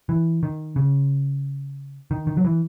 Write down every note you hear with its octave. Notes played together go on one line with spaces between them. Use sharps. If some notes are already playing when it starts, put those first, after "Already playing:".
E3
D#3
C#3
D#3
D#3
F#3
E3